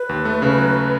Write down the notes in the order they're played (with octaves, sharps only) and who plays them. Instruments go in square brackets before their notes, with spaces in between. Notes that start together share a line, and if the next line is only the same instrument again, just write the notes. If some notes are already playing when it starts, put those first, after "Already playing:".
Already playing: [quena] B4
[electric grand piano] D#2
A3
C#3
F#3